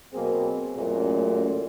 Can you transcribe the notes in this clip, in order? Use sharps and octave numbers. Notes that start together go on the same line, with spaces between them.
B2 F#3 A#3 C4 G#4
A1 F#2 A#2 G#3 A3